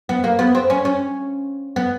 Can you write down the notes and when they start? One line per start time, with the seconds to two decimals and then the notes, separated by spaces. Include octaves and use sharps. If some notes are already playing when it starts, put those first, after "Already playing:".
0.09 B3
0.24 A#3
0.39 B3
0.55 C4
0.70 C#4
0.85 C#4
1.76 B3